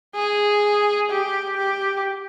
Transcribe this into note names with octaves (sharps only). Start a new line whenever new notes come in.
G#4
G4
G4